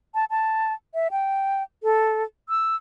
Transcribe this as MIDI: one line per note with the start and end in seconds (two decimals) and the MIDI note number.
0.15 0.25 81
0.30 0.73 81
0.94 1.08 76
1.11 1.63 79
1.83 2.23 69
2.49 2.76 88